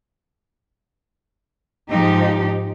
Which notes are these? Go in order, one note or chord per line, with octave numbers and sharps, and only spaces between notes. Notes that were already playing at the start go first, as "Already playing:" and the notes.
G#2 F3 D#4 G4